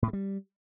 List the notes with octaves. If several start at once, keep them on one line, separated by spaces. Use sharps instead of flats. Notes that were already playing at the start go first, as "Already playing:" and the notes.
A2
A3
G3